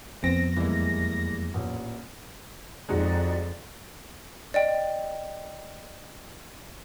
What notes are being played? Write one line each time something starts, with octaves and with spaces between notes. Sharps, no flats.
F2 B3 C4 A#6
E2 E3 G3 G#3 A#3
A1 A#2
F2 G#3 D#4 F#4 D5
D5 D#5 G5